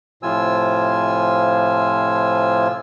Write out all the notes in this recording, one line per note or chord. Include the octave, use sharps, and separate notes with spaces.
A2 C3 F3 F4 G#5 E6